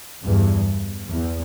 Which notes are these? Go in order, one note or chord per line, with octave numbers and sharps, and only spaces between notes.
E2 G2
E2